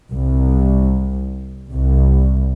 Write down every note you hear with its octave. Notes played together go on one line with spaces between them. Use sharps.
C2
C2